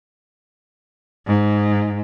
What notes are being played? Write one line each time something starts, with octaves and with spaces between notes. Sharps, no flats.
G#2